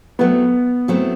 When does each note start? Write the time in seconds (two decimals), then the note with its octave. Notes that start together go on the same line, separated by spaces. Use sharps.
0.19 F#3 A3 B3 C4 E4
0.88 F#3 A3 C4 E4